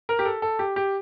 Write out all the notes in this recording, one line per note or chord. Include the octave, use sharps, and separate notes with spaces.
A#4
G4
A4
A4
G4
G4